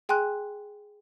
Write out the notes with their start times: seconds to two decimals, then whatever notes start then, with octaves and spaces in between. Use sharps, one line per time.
0.09 G#4 G5 G#5 C6 F#6